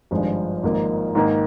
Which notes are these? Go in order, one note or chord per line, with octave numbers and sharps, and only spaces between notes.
G#1 G2 F3 G#3
G#1 G#2 F3 A#3 D#4
G#2 D#3 A#3